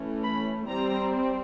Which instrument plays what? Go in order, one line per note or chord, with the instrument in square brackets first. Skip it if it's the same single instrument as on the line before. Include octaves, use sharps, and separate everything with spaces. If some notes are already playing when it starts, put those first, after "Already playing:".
Already playing: [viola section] E3 A3 C#4
B5
G3 C4 A#5